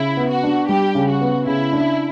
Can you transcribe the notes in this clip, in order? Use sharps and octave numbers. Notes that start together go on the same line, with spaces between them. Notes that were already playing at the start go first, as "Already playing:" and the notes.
Already playing: C#3 E4
B3
F#4
D4
G3 G4
C#3
F#4
B3
C#3 E4
D4